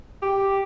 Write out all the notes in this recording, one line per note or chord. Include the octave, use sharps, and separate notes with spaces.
G4